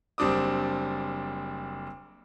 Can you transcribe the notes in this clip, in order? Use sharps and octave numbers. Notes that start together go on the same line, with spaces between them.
F#1 G3 C4 D4 D6 D#6